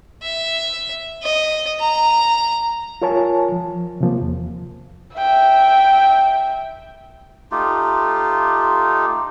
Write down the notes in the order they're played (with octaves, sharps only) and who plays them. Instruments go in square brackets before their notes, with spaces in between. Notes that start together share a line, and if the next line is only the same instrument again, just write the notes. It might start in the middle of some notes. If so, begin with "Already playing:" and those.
[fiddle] E5
D#5
A#5
[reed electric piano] F4 A#4 C#5 G#5 A5
F3
C3 F3 A#3
E2
[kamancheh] E5 G5
[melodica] A3 D#4 F4 G4